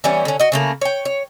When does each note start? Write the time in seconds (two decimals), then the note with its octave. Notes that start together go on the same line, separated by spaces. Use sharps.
0.04 E3 G3 B3 C#4
0.25 D3 C#4
0.40 F#4 D#5
0.52 C#3 A3 A#3
0.81 C#5 G5
1.05 C#5